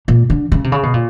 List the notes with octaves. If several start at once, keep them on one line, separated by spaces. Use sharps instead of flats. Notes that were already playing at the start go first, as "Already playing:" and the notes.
A#2
D3
C#3
C3
C#3
B2
A#2